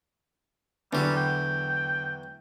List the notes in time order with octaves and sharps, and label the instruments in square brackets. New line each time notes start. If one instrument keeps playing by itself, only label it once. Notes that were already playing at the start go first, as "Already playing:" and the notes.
[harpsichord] E2 F#3 [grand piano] D3 [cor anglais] G3
[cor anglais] G5